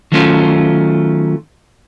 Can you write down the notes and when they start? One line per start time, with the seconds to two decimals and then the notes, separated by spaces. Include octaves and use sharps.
0.12 D#3 F#3 A3 C#4 F4 C5